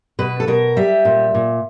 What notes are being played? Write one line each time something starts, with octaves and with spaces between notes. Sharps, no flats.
B2 B4
A4
B2 A#4
G3 E5
A#2
A#2